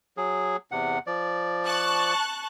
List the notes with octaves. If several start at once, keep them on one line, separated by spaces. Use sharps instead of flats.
F#3 G#4
E2 C3 F#5
F3 D5
A5 C#6 F#6